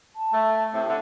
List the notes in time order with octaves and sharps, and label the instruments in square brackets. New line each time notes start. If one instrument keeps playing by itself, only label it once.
[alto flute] A5
[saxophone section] A3
[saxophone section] A2 C3 [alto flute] E5
[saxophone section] D3